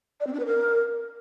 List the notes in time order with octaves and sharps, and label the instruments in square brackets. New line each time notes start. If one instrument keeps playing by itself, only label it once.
[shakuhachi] D5
C4
D4
B4
A#4